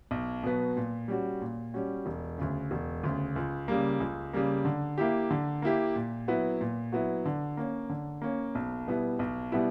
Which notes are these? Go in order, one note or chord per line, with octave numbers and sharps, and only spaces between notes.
B1
B2 F#3 B3
A#2
G3 C#4 F#4
A#2
G3 C#4 F#4
E1
D2 C#3
E1
D2 C#3
C#2
C#3 G3 A#3
C#2
C#3 G3 A#3
D3
A#3 E4 G4
D3
A#3 E4 G4
A#2
F#3 B3 E4
A#2
F#3 B3 E4
D3
A#3 C#4
D3
A#3 C#4
B1
B2 G3 B3 E4
B1
B2 G3 B3 E4